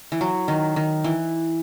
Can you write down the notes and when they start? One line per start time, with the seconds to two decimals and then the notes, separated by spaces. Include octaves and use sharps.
0.12 E3
0.21 F#3
0.48 D#3
0.76 D#3
1.04 E3